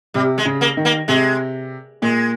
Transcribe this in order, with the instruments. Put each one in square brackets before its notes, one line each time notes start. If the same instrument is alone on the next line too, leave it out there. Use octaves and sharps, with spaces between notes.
[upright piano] C3 [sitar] G3
[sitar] G#3
[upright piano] C#3
[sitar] A#3
[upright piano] D#3
[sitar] A#3
[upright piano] C3 [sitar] G#3
[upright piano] A#2 [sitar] G#3